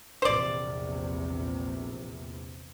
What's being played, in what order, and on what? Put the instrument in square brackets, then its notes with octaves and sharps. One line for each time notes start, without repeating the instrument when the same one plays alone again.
[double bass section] A#1 E2 C3 [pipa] C5 D5